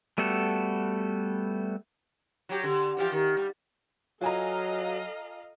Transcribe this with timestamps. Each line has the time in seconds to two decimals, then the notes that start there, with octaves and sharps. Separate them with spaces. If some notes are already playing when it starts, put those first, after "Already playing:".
0.18 G3 A3 B3 F#4 A4
2.49 F#3 G4
2.63 D3
2.97 E3 F3 G4
3.12 D#3
3.37 G3
4.21 F#3 F4 A4 D#5 F5 G#5 A#5